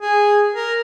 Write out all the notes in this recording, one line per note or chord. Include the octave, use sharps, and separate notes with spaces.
G#4
A#4